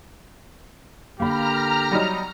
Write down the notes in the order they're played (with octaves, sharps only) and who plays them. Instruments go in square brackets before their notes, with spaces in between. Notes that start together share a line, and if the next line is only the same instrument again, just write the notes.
[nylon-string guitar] D3 A#3 [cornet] G4 [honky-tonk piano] F5 B5 [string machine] A#5 F6
[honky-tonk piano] F#3 G3 D#4